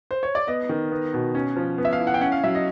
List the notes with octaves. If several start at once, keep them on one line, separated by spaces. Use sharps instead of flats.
C5
C#5
D5
B3 D#5
D#3
B3
B2
C#4
F3
B3
E5
F5
E4
F#5
G5
C#4 F#5
F5
F#3 E5
D#5